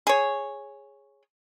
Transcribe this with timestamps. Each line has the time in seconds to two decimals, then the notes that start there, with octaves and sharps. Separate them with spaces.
0.07 G#4 C#5